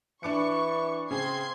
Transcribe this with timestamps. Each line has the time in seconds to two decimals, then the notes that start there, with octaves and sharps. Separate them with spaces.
0.23 E3 D4 C#6 D6 C#7
1.11 C#3 C4 G#4 C6 G#6 C7